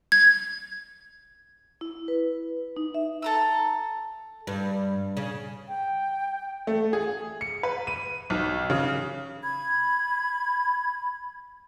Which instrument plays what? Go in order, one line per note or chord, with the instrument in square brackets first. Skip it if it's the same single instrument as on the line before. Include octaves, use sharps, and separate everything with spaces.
[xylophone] G#6
[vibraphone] E4
B4
D#4
E5
[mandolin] A4 A#5 E6
[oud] G2
C#3
[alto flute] G5
[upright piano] A3
G#4
C#7
B4
D#7
B1
C#3
[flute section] B5 G#6